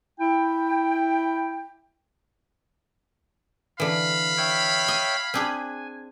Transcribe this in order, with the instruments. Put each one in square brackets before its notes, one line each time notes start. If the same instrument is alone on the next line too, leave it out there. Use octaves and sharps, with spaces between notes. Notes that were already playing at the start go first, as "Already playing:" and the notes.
[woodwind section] E4 G5
[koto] D3 E3 [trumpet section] F5 B5
[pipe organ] C#5 E5 G5
[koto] D#5
[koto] C4 D4 G#4 [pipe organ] G#5